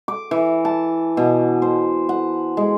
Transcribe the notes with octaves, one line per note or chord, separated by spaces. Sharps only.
D6
E3
A5
B2
C5
F#5
G#3